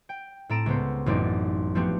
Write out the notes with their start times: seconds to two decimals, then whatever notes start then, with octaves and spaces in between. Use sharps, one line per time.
0.09 G5
0.49 A2 C4 A4 A#5 D7 E7
0.66 C#2 B3 C5
1.06 A1 F#2 C4 D#4 D5
1.75 F3 A3 B3 C4 F#4 G4